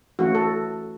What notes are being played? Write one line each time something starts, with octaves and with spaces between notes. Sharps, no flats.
E3 A3 C#4 F#4
A4